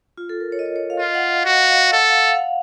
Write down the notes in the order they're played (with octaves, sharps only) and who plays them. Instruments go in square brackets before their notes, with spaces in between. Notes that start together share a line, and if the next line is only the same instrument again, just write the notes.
[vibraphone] F4
A4
A#4
C#5
D#5
C#5
C#5
F5
[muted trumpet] F4 [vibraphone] D#5
[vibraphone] F#5
F5
[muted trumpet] F#4 [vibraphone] F#5
[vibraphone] F5
F5
[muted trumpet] A4 [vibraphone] F#5
[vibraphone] F5
F#5
F5